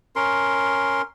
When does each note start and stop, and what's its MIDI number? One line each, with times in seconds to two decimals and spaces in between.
0.16 1.02 61
0.16 1.02 70
0.16 1.02 84